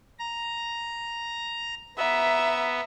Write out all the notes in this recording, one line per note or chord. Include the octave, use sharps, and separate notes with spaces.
A#5
B3 E5 A#5